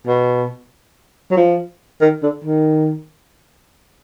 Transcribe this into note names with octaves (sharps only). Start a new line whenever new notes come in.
B2
F#3
F3
D#3
D3
D#3